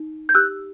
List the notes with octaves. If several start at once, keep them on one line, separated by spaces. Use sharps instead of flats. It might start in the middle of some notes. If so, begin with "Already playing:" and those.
Already playing: D#4
G6
G4 E6 F#6